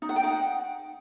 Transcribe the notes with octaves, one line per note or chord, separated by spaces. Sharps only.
D#4
F#5
G5
D#4
F#5